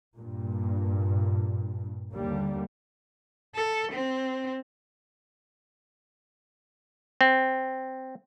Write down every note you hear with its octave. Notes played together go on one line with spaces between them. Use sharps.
G2 A#2
D#2 D3 G3 A#3
A4
C4
C4